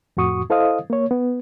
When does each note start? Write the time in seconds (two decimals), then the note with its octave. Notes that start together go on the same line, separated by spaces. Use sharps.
0.17 F2 A2 F#4 C#6 D#6
0.50 E4 A4 C5 D#5 F5 D#6
0.90 A#3 C#5
1.11 B3